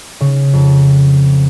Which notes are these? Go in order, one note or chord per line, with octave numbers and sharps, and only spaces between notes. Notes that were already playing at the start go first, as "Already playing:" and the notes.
C#3
F2